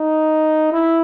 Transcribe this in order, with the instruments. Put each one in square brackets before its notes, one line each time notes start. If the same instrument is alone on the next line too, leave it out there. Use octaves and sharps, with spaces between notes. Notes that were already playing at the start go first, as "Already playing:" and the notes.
Already playing: [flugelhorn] D#4
E4